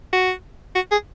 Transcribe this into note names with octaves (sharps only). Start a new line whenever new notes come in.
F#4
F#4
G#4